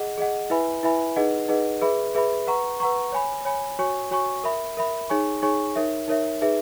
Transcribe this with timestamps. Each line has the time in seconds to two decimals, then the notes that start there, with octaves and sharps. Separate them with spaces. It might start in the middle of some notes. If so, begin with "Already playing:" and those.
Already playing: G#4 D#5 F#5
0.18 G#4 D#5 F#5
0.50 E4 B4 E5 G#5 B5
0.83 E4 B4 E5 G#5 B5
1.16 D#4 G#4 B4 D#5 F#5
1.48 D#4 G#4 B4 D#5 F#5
1.82 G#4 B4 E5 B5
2.15 G#4 B4 E5 B5
2.47 B4 F#5 A#5 C#6
2.80 B4 F#5 A#5 C#6
3.12 C#5 G#5 B5
3.45 C#5 G#5 B5
3.79 F#4 C#5 G#5 C#6
4.11 F#4 C#5 G#5 C#6
4.44 A#4 E5 B5
4.77 A#4 E5 B5
5.09 D#4 G#4 C#5 G#5 C#6
5.42 D#4 G#4 C#5 G#5 C#6
5.76 D#4 A#4 C#5 E5
6.08 D#4 A#4 C#5 E5
6.41 D#4 G#4 B4 E5